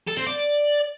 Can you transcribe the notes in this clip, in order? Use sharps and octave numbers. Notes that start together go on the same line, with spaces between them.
A4
C4
D5